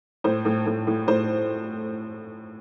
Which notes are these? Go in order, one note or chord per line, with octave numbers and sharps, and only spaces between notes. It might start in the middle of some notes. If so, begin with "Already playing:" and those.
A2 C5
A2
A2
A2
A2 C5